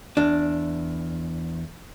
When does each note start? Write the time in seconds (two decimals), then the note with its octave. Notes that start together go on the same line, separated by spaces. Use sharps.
0.17 E2 D4